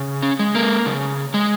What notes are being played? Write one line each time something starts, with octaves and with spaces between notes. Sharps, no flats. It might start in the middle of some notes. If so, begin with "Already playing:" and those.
Already playing: C#3
C#4
G#3
A#3
C#3
G#3